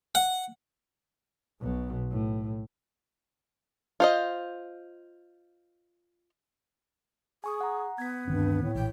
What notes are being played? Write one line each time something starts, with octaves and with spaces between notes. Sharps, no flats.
F#5
B1 B2
A2
F4 C5 D#5
G#4 G#5 C#6 D#6
F#5 A#5
B3 G#6 B6
D2 G2 D#3 C4
A2
A#1 E3 G5